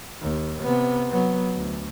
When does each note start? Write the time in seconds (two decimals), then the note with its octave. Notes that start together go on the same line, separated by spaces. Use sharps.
0.21 D#2
0.62 C3 B3
1.09 F#3 B3
1.54 D2